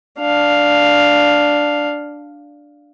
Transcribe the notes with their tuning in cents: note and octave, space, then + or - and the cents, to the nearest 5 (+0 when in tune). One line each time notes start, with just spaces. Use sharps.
D4 +0 F5 +0